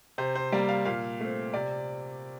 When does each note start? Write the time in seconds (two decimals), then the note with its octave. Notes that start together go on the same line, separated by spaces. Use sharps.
0.18 C3 C5
0.35 C5
0.52 G3 A#3 D5
0.69 F5
0.85 A#2 F5
1.20 A3 C4
1.54 C3 D5